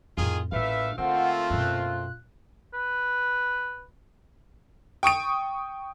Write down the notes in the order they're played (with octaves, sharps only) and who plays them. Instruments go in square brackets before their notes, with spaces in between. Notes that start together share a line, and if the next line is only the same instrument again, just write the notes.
[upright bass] F2 A2 [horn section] D#3 F4 G#4
[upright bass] A1 E4 [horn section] A#2 A3 F5 [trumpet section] B4 E5
[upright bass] D3 [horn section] A3 A#3 C4 [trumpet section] F4 [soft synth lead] F#5
[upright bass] F#2 B2 [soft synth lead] F#6
[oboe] B4
[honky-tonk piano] G5 C#6 D#6 D7